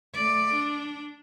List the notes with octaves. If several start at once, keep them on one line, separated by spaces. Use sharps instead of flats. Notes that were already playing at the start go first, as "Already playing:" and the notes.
A3 D5
D4